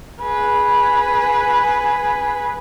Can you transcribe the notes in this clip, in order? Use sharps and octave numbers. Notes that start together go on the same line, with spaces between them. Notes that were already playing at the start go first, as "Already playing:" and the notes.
G#4 B4